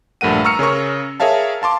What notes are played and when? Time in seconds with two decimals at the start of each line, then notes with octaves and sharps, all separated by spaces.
0.21 A#1 G2 A3 A#4 F#5 D#7
0.44 A#5 C#6 E6 F6 C#7
0.59 C#3 C#4 A#4 C#6
1.20 G#4 A#4 C#5 E5 F5 A5
1.62 F5 A5 C6 D6